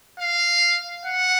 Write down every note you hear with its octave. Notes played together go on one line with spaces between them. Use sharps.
F5
F#5